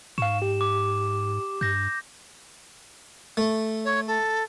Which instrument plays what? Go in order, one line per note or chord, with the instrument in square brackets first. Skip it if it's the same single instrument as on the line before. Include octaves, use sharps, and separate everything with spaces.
[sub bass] G#2 [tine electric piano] F5 C#6 [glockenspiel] E7
[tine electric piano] G4
[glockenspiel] D6
[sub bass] G2 [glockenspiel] G6 A#6
[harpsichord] A3
[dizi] C#5
A4